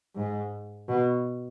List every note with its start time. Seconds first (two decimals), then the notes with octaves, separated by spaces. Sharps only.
0.15 G#2
0.88 B2